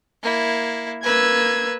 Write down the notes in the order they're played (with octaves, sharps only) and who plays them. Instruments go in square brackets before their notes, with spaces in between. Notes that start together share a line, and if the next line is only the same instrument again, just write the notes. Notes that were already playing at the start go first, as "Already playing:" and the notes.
[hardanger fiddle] A#3 E4
[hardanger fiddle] A#3 B4 [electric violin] E6 G#6